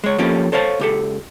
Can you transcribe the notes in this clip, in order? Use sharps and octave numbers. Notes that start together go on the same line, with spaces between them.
G#3 C#5
F3 A#3 C#4 G4 A4
A4 C5 C#5 F5 A5
C#2 G4 A4